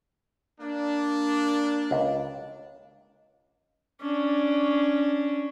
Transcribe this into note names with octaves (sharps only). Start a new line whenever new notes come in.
A#3 D4
C#2
C#4 D4